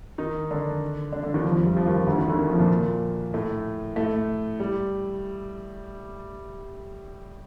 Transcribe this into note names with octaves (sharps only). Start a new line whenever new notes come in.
D#3 D#4
D3 D4
D3 D4
D3 D4
D#2 D#3
F2 F3
F2 F3
G2 G3
F2 F3
D#2 D#3
D2 D3
D#2 D#3
D2 D3
D#2 D#3
F2 F3
A#2 A#3
A2 A3
A2 A3
G3